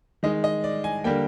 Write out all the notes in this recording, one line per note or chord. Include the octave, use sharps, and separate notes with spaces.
D#3 G#3 D#5
D#5
D5
G#5
D3 G3 A#3 G5